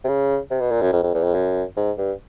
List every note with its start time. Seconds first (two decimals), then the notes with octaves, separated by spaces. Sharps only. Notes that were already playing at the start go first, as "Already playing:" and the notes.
0.04 C3
0.08 C#3
0.50 C3
0.61 B2
0.71 A#2
0.81 F#2
0.92 F2
1.03 F2
1.14 E2
1.23 F2
1.34 F#2
1.77 G#2
1.98 G2